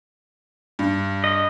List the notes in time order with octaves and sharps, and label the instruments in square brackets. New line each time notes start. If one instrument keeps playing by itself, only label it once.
[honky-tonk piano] G2
[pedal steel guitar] D#5